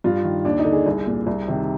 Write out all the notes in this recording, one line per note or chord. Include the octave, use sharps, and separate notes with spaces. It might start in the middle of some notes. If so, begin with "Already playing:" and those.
G2 F4
D#3
D#2 D4
D#4
D3
G#4
C2
A#2
C2
C3 D#3